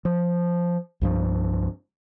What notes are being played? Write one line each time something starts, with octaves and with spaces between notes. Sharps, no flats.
F3
C2 G2 F3